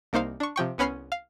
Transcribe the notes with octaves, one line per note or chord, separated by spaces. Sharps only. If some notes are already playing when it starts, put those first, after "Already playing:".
C2 A#3 D#4 C5 F5
D4 C#6
C3 F3 G5 C#6
C2 B3 C#4 B5 F6 C7
F5